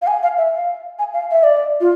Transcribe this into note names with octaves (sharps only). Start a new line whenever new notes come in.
F5
G#5
F5
E5
F5
G#5
F5
E5
D5
F4